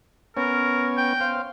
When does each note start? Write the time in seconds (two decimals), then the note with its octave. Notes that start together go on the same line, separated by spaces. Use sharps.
0.37 B3 C#4 A#4 C#5
0.97 G5
1.21 C5 F5